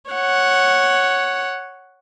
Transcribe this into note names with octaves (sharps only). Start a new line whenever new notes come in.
C#5 F#5